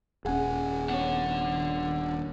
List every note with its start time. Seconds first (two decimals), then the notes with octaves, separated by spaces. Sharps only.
0.25 D#1 C#4 G#4 F#5 G#5
0.90 B3 D4 C#5 F#5